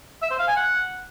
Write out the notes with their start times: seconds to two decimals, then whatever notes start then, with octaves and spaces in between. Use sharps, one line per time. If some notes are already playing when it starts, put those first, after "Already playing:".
0.22 E5
0.31 C5
0.39 F5
0.48 G#5
0.56 F#5